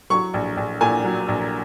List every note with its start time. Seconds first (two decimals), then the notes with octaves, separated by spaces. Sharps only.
0.10 F#3 C#6
0.34 A#1
0.57 A#1
0.81 A#2 G#5
1.04 F#3
1.28 A#1